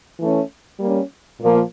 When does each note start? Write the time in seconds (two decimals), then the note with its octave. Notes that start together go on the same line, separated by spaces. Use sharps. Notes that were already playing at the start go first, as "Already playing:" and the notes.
0.20 E3 A3 C#4
0.80 G3 A#3 C#4
1.40 A#2 F3 A#3